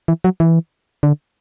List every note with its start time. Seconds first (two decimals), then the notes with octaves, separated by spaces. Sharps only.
0.08 E3
0.24 F#3
0.40 E3
1.03 D3